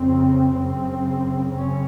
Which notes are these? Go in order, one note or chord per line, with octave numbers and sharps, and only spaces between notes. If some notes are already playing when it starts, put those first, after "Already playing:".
Already playing: F2 C#3 C4
F#2 C#3 C4
F#2 C#3 C#4